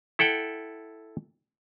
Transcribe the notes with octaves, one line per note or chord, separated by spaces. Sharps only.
E4 A4 F#5 G5